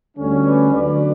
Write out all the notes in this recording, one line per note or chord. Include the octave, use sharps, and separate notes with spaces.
D2 D3 G3 C#4
B4 D5
D2 D3 F#3 B4 D5